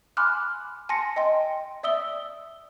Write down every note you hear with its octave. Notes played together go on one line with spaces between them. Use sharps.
G#5 B5 C6 D6 F6 F#6
G#5 A5 C6 A#6 C#7
D#5 G5 C6
D5 E5 D#6 E6 G7